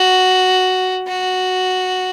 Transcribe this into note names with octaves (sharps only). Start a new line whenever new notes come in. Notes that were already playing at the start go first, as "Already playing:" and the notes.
Already playing: F#4
F#4